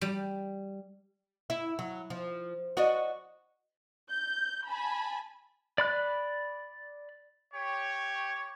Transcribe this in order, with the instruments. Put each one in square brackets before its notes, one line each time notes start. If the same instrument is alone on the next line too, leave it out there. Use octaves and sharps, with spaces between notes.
[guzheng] G3
[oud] E4
F#3
F3
F#4 D5 D#5
[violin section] G6
G#5 A5 B5
[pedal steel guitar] D5 B5 F#6
[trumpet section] G4 C#5